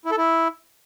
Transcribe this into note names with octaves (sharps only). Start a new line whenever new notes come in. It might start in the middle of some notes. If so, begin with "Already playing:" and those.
E4
A4
E4